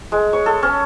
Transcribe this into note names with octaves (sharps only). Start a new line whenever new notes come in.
G#3
C#5
A4
C#4